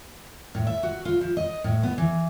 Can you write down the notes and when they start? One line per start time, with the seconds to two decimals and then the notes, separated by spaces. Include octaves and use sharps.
0.55 A2
0.67 E5
0.83 F#4
1.05 F4
1.21 F3
1.37 D#5
1.64 A2
1.83 B3
1.98 E3